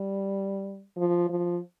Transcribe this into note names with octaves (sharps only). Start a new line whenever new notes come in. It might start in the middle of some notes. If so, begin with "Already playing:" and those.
Already playing: G3
F3
F3